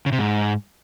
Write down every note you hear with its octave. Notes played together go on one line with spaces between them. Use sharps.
C#3
C3
G#2